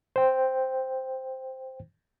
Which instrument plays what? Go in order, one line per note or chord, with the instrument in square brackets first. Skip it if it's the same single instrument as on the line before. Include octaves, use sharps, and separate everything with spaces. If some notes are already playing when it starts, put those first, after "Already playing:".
[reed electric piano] C5 G5